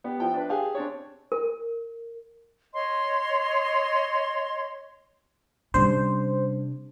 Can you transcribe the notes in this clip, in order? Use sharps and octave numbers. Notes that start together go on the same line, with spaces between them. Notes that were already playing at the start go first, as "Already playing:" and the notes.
B3 G4
F3 E4 G5
D4 B4
G4 G#4 F5 G#5
C4 D4 C#5
A#4
C#5 D#5 C6
C3 G3 C#4 D4 C5